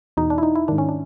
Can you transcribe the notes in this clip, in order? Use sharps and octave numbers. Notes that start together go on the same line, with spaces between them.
E2 B2 D#4
D4
E4
D#4
E4
G#2 D#3 D4
C#4
D4